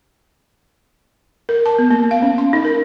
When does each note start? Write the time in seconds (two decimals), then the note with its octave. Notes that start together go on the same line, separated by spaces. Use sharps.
1.49 A#4
1.66 A5
1.78 B3
1.90 A#3
2.11 F5
2.22 C#4
2.38 C6
2.53 D#4
2.65 A#4